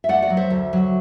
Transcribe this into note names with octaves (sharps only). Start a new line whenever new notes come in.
E5
A3 D5 F#5
D5 F#5
F#3
C5 E5
D2
F#3